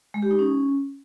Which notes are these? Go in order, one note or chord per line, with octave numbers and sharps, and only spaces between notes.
G#3
G4
D#4
C#4